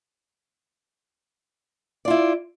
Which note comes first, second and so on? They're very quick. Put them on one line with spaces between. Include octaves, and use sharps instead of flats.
D5 F4 E4